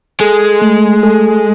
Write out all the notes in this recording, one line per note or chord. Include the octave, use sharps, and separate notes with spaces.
G#3 A4
A3
A4